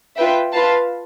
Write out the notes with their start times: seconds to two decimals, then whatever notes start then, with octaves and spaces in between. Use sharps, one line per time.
0.17 F4 B4 E5 G5
0.53 F4 B4 F5 A5